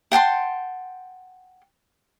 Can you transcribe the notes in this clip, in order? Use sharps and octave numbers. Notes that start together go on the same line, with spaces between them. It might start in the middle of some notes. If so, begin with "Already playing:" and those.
F#5 G5 A5 C6